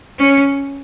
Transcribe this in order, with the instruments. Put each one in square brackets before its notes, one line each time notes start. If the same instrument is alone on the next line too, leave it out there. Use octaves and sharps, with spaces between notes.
[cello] C#4